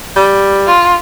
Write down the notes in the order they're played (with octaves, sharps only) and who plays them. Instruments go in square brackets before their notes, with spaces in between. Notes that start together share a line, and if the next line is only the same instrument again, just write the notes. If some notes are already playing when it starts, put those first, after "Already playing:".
[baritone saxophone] G3
[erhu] F4